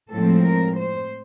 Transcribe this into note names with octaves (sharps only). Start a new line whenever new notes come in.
A2 F3 G#3 C4 A4
A#4
C5